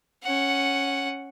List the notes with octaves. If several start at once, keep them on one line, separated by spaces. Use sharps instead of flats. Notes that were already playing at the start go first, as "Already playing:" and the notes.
C#4 F#5